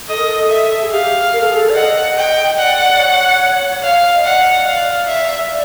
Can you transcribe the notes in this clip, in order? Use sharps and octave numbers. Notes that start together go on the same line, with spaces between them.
A4 D#5
A#4
A4
E5
G#4
G4 F5
A#4
A4
G#4
A4
D5
D#5 F#5
D#5 G5
D5 F#5
D5
C#5
F5
D#5
D5 F#5
E5
D#5
D5
D5 F5
E5
D5